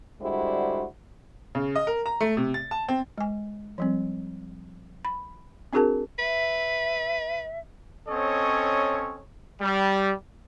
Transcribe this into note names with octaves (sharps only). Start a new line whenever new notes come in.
D3 G3 G#3 E4 F#4 C5
C#3
D#5
A#4
A#5
A3
C3
A6
A5
C4
G#3 G#5
F3 G3 C4
B5
C4 D4 F#4 G#4 A#4 A5
B4 E5
C4 C#4 A4 C#5 D#5
G3